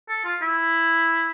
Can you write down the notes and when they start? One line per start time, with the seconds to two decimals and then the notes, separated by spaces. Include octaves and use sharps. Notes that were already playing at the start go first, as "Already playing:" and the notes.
0.09 A4
0.25 F4
0.42 E4